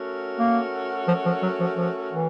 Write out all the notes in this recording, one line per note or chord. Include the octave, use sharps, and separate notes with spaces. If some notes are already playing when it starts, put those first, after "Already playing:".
Already playing: A3 C#4 F#4 A#4
A#3
F3
F3
F#3
F3
F3
E3